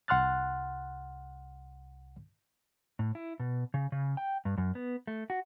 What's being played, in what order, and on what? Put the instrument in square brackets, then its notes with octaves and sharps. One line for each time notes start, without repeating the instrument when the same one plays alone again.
[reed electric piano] C2 F#5 C6 F6 F#6 A6
[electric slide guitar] A2
E4
B2
C#3
C#3
G5
G2
F#2
B3
A3
F#4